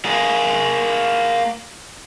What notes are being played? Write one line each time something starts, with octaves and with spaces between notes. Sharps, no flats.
A#3 G#4